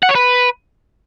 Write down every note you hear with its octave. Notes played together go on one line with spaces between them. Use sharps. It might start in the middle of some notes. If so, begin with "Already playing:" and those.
F#5
C#5
B4